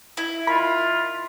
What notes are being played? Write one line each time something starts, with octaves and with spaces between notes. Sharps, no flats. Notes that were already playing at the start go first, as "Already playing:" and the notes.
E4
D#3 F4 B5